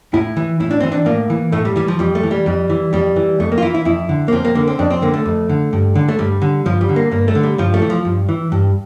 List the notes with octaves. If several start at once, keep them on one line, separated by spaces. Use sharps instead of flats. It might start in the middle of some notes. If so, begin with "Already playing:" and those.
A2 E4
E3
A2 E4
D4
E3 C4
D4
A2 A#3
E3
A2 A3
G3
E3 G3
F3
F2 G3
A3
E3
G3
F2 G3
E3
F2 G3
E3
F2 A3
A#3
F4
E3 E4
E4
F2 E4
D3
A#3
F2 C4
A#3
D3 A#3
C4
F2 D4
C4
D3 A#3
A3
F2
D3
G2
D3
A3
G2 G3
D3
G2 F3
G3
D3
A#3
G2 A#3
A3
D3
G3
G2 F3
A3
E3
F3
G2
E3
G2